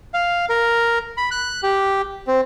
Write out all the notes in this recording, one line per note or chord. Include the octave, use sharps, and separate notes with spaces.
F5
A#4
B5
F#6
G4
C4